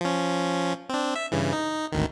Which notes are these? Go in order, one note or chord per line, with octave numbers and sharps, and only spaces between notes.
F3 C#4
C4 D4
E5
G2 C#3 E3
D#4
G#1 D2 D#3